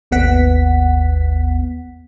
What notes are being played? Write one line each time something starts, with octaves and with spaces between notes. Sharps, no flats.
G#1 D#2 B3 F#5 B6